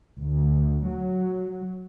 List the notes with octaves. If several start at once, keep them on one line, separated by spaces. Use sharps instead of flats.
D2
F#3